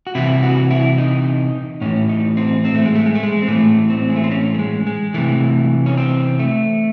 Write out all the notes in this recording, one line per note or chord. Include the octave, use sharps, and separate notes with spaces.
F#4
C3 E3 E4
F#4
E4
D#4
A2 E3 C#4
D#4
C4
C4
A3
G#3
A3
G#3
A3
G#3
C4
A2 E3 A3
C4
G#3
A3
C4
C#4
A3
G#3
G#3
C3 E3 A3
C#4
C4
A3